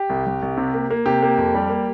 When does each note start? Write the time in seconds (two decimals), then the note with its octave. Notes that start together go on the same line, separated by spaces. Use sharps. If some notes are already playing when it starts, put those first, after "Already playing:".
Already playing: G4
0.10 C2
0.26 C2
0.42 C2
0.57 C3
0.74 A#3
0.90 A#3
1.05 C3 G4
1.22 A#3
1.38 F2
1.55 G3
1.70 A#3